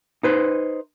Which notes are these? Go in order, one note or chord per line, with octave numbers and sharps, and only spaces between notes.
D#4 B4 C5